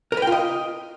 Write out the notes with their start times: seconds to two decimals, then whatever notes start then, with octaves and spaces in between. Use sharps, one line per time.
0.12 A#4
0.17 B4
0.22 G5
0.27 F4
0.32 D#5